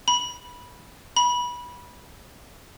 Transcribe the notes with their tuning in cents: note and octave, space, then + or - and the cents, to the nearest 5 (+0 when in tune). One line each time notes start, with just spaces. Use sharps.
B5 -15
B5 -20